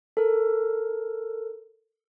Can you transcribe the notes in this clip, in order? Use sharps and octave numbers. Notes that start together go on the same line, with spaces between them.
A4 A#4